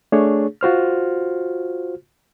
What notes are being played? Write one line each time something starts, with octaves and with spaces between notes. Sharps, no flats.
A3 D4 G#4 C#5
F4 F#4 C5 F6